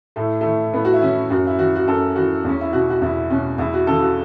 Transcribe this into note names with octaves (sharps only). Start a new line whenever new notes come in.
A2 A3
E3 A3
A2 B3
F#4
E4
E3 C#4
F#2 F#4
E4
E3 F#4
F#4
F#2 A4
E3 F#4
E2 C#4
E4
B2 F#4
F#4
E2 E4
B2 C#4
E2 E4
F#4
C#3 E3 A4
F#4